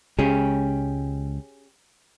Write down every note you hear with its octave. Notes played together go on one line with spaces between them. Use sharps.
C#2 C#3 G#3 C#4 G4 G#4